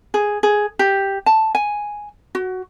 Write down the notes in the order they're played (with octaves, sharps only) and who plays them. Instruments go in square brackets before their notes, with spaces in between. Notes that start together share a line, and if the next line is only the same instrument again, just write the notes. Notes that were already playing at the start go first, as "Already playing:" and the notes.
[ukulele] G#4
G#4
G4
A5
G#5
F#4